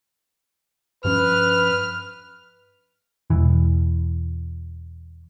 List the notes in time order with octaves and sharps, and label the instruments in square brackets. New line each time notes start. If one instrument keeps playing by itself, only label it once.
[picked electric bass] G2 F3 C#4 [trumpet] B4 [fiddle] F6
[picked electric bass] E1 E3